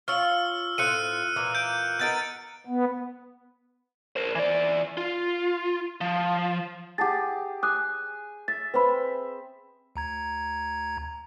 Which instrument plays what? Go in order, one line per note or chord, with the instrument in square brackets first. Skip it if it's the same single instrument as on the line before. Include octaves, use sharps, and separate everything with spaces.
[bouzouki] F4 C#5 F5 [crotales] E6 F6
[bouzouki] A2 C4 F4 [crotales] F#6 C#7 D#7
[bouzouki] A#2 E3 A#3
[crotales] G6 D7
[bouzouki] B3 D#4 A#4 [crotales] G6 A6 D7
[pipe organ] B3
[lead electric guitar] A#4 C5
E3 D5
F4
F3
[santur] G4 G#4 [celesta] F#5 A5 A6
[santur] G#5 [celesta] D6 D#6 F#6
[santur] E5 [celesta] A6
[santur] C4 E5 [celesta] B4 C5 B5
[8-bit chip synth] D2 A#5 G#6